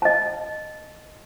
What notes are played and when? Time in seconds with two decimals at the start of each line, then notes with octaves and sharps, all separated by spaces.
0.02 D#5 A5